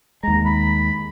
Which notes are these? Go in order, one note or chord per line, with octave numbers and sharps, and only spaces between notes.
D#2 G#3 A#5
B5